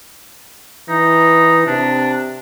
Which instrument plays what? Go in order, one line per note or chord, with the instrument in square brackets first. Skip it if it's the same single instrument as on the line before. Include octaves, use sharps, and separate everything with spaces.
[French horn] E3 [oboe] D#4
[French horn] C3 [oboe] D4